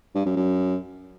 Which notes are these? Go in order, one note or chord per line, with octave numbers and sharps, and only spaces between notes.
G2
F#2
F#2